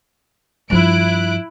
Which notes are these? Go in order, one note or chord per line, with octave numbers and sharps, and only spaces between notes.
G2 F3 E4 F#6 D7